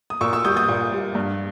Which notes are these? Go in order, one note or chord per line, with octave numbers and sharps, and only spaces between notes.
D#6
A#2 C#6 E6
C#6 E6
G3 D#6 G6
D#6 G6
A#2
G3
G2